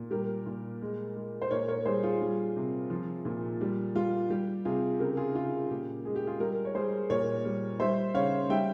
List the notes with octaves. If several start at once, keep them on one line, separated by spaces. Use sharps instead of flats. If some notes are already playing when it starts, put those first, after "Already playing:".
Already playing: A#2
G3 G4 A#4
A#2
G#3
G#3
C5
A#2 A#4 C#5
A#4 C#5
G3 G#4 C5
F4 G#4
G3
C3
F3
A#2
G3
G3 F4
G3 G4
C3 F4 G#4
C#3 G4 A#4
F4 G#4
C#3 F4 G#4
A#2 G4
G#3 G#4
G4
F4 G#4
G3 G4 A#4
C#5
G3 G#4 C5
A#2 A#4 C#5
G3
G3 C5 E5
C#3 C#5 F5
G3 E5 G5